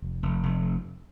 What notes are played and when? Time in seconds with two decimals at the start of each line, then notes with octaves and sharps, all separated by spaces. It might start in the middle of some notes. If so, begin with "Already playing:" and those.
0.02 F1
0.23 F1
0.43 F1